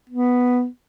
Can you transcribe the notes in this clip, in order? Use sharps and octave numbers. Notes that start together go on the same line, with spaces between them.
B3